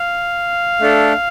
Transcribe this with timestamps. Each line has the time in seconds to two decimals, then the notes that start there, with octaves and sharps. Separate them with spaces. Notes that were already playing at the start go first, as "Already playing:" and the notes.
Already playing: F5
0.80 A3 D4 A4